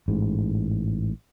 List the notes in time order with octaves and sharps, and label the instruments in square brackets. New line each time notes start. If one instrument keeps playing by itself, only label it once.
[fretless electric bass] A1 G#2